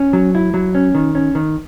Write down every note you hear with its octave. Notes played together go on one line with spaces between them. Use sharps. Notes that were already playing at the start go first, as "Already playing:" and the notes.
Already playing: C#4
F#3
E4
F#3
C#4
D#3
C#4
D#3